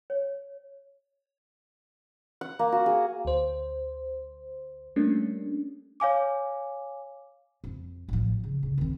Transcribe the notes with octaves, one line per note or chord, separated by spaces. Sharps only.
C#5
F#5
A#3
F#4
G#4
D2 C5
G3 A3 A#3 C#4 D4
C#5 F5 G#5 D6
F2
A1 F3
C#3
C#3
D#3 C4